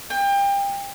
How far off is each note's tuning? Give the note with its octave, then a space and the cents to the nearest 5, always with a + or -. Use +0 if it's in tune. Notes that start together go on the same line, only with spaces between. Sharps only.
G5 +30